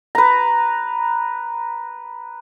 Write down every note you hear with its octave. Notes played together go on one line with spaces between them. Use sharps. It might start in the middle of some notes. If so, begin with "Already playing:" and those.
B4 A#5